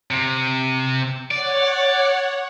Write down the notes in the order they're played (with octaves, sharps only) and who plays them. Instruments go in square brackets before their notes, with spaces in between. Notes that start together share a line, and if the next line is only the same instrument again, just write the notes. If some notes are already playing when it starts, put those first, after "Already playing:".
[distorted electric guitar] C3
[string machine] C#5 F#5 [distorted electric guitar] D5